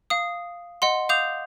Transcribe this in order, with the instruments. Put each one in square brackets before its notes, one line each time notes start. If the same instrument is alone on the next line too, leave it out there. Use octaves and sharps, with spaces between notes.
[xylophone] F5 D#6
D#5 F#5 C6
F5 D6 D#6 G6 F7